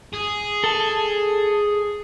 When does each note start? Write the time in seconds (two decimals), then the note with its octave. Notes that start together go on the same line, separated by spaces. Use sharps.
0.14 G#4
0.64 A4 A5